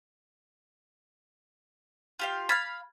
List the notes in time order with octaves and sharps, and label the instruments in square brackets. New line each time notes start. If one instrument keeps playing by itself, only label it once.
[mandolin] F4 G4 F5
[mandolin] F5 B5 [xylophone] F6 G#6 A6